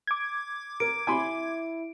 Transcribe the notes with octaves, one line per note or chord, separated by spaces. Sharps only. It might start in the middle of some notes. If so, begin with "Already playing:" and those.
D6 G#6
A#4 D7
E4 G#5 B5 C6